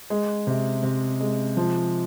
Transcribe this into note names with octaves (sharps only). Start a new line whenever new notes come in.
G#3
C3
C3
G#3
F3